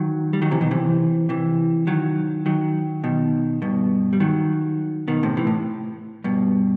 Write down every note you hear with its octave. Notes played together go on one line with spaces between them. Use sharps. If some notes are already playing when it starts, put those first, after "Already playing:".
Already playing: D#3 F#3
G3
D#3 F#3
C3 E3
B2 D#3
C3 E3
C3 E3
D#3 F#3
D#3 F#3
B2 D#3
G2 B2
G3
D#3 F#3
B2 D#3
A2 C3
C3 E3
A2
G2 B2